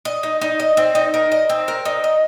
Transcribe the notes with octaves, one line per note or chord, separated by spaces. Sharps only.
D#5
D#4
D#4
D#5
C4
D#4
A#4
D#5
C4
A#4
D#4
D#5